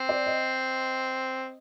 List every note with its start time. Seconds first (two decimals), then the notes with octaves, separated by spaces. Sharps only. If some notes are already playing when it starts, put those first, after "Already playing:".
Already playing: C4
0.09 D5
0.26 D#5